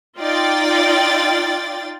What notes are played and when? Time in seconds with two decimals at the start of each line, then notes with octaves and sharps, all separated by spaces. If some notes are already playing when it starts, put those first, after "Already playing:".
0.19 D#4 F4 D5 G5 A6